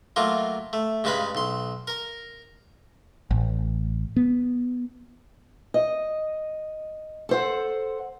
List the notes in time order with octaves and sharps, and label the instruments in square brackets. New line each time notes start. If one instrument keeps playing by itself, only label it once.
[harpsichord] F#3 A3 A#3 F4
A3
G2 C#3 G#3 B4 F5 B5
B1 C6
A#4 A#5
[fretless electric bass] A1
B3
[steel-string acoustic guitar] D#5
A4 C5 F#5